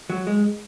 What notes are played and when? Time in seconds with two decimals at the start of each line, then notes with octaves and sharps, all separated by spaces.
0.10 F#3
0.27 G#3